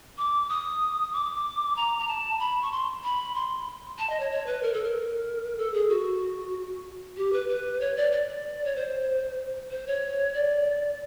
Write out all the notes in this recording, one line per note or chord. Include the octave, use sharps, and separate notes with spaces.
D6
D#6
D6
A#5
A#5
A5
B5
C#6
C6
B5
C6
A5
D#5
C#5
C#5
B4
A#4
A4
A#4
A4
G#4
F#4
G4
B4
B4
C#5
D5
D5
C#5
C5
C5
C#5
D5